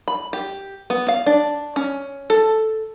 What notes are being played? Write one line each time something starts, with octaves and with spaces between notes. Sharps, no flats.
B5
G4
B3
F5
D4
C#4
A4